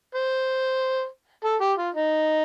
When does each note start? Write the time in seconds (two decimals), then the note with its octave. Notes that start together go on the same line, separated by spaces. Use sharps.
0.15 C5
1.45 A4
1.61 G4
1.78 F4
1.94 D#4